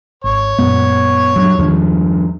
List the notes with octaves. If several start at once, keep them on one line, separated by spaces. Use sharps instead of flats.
G#1 C#5
F#2 A#2 G#3 B3
G2 F#3
E2 G2 D#3 F3 G#3